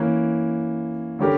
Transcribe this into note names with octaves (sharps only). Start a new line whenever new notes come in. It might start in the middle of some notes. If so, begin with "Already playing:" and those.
Already playing: E3 A#3 C#4
D3 G3 C#4 G4 A#4